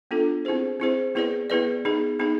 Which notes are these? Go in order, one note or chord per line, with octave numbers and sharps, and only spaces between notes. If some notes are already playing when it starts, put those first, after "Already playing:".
B3 D4 F4 A4
C4 E4 G#4 C5
C4 E4 G#4 C5
B3 E4 G#4 B4 D5
B3 E4 G#4 B4 D5
B3 D#4 G#4
B3 D#4 G#4